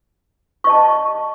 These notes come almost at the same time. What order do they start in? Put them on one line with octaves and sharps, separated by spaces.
C#6 D#5 A5